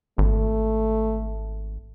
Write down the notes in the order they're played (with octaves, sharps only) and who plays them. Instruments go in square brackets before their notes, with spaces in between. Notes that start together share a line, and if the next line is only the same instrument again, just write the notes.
[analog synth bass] G#1 [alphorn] A3